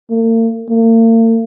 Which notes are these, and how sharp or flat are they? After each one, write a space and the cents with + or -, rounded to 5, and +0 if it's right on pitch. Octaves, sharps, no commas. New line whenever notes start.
A#3 -45
A#3 -45